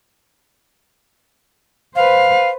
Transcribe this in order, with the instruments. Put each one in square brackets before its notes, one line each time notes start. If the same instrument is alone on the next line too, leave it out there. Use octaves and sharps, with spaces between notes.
[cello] B4 C5 [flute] F5